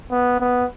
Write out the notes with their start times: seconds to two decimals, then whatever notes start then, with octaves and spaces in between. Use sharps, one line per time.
0.11 B3
0.40 B3